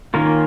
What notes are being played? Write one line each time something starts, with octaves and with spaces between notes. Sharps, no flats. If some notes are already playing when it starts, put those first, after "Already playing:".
D#3 A#3 C#4 F4 A#4